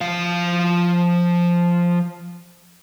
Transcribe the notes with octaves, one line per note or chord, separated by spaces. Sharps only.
F3 F5